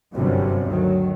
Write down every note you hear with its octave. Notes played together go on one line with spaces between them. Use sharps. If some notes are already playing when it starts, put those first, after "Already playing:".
G1 F#2 C3 F#3 G3
D2 D#3 F#3